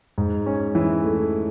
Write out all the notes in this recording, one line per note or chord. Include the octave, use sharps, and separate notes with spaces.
G#2
C#4
E3
A3